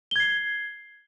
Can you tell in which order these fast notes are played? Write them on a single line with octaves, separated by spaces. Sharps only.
G7 G#6 C7